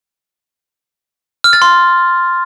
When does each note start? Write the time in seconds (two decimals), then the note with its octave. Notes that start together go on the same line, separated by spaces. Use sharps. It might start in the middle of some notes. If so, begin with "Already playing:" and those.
1.44 F6
1.53 A6
1.62 C6